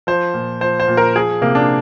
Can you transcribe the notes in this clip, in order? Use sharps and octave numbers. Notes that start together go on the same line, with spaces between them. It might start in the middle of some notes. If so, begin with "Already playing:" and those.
F3 C5
A#2
F3 C5
C5
A#2
A#4
F3 G#4
C3 A#3
D4